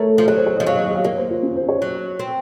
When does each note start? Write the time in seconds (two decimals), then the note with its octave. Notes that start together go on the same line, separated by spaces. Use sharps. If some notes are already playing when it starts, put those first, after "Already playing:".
Already playing: A3 A#4 C#5
0.18 F3
0.28 F#3 C#5
0.37 C5
0.47 C#5
0.57 F3 D#5
0.66 F#3 F5
0.75 D#5
0.86 D#5
0.95 F5
1.04 A#3 C#5
1.18 C5
1.31 F4
1.43 C#4
1.56 C5
1.69 C#5
1.82 F#3
2.19 C4